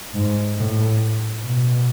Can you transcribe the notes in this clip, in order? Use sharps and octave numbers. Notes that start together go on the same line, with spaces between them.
G#2
A2
B2